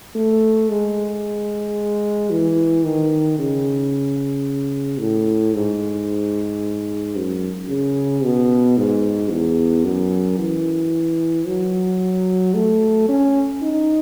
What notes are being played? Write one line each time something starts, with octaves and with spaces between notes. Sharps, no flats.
A3
G#3
E3
D#3
C#3
A2
G#2
F#2
C#3
B2
G#2
E2
F#2
E3
F#3
A3
C#4
D#4